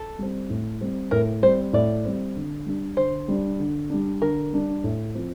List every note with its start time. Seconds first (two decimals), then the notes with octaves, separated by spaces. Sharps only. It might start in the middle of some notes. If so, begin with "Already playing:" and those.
Already playing: A4
0.19 G3 C4
0.50 A2
0.81 G3 C4
1.11 A2 A#4
1.42 G3 C4 C5
1.73 A2 D5
2.05 G3 C4
2.36 D3
2.66 G3 D4
2.97 D3 C5
3.28 G3 D4
3.60 D3
3.90 G3 D4
4.22 D3 A#4
4.53 G3 D4
4.84 A2
5.15 F3 C4